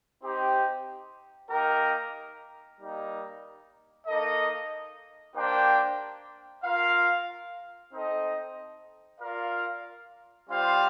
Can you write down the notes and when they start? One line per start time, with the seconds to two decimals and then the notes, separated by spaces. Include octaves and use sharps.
0.21 C4 D#4 G4
1.49 A#3 D#4 G4 A#4
2.78 G3 A#3 D#4
4.07 A#3 D#4 A4 D#5
5.35 A#3 D4 G4 C5 G5
6.64 F4 A#4 F5
7.92 C4 D#4 A4 D#5
9.20 F4 A#4 D5 F5
10.48 G3 C4 F4 C5 F5